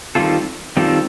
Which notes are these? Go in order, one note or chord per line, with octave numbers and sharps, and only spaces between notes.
D#3 G3 C4 F4 A4
D#3 G3 C4 F4 A4